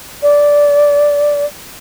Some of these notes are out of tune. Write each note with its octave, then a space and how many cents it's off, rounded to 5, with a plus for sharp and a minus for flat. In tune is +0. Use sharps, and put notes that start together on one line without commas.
D5 -10